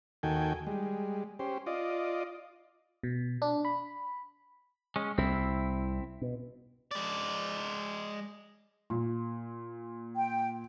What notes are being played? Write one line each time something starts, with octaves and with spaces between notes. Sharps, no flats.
D#2 D#3 F#4 A4 G5 G#5
G3 G#3
C#4 G4 C5
F4 D5 D#5
B2
D4
B5
G#3 C#4
C2 C4 E4
B2
G#3 D5
A#2
G5